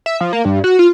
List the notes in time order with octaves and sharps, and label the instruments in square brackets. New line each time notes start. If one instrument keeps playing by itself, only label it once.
[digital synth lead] E5
F3
A#3
G2
F#4
F4